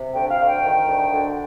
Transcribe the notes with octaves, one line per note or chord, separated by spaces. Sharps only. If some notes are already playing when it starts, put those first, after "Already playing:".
Already playing: C3
D2 G5
F5
D2
G5
D#3
D2
D3